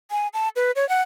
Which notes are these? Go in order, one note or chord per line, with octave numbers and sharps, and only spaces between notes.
G#5
A5
B4
C#5
F#5